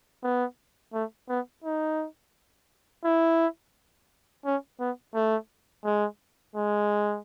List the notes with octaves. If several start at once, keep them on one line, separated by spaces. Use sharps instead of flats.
B3
A3
B3
D#4
E4
C#4
B3
A3
G#3
G#3